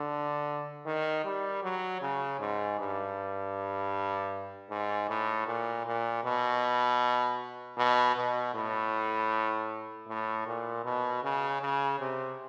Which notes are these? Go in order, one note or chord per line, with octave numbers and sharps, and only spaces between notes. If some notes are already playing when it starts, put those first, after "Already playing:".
Already playing: D3
D#3
G3
F#3
C#3
G#2
G2
G#2
A2
A#2
A#2
B2
B2
B2
A2
A2
A#2
B2
C#3
C#3
C3